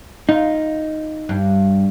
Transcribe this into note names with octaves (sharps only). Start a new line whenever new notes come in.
D#4 F4
G2